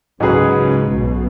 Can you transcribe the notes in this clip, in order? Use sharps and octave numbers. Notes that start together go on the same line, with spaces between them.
C#2 G#2 C#3 F#3 C#4 G#4 B4
C#2 C#3
B1 B2